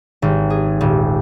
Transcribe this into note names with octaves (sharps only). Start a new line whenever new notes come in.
G#1
G#4
D#1